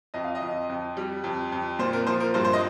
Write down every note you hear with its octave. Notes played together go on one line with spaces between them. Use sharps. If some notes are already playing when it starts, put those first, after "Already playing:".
F2 D#5
F5
D#5
F2
F2
G3
F2
F2
A#2 C5
A#4
F3 C5
A#4
G2 C5
C5
D#5